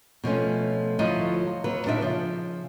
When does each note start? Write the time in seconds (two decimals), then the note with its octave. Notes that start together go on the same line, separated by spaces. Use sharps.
0.24 B2 F3 A3 C#4
0.99 D2 F3 F#3 E4 F4 D#5
1.64 D#2 F#3 B4
1.86 A#2 D4 D#4 D#5 E5
2.01 C#3 F3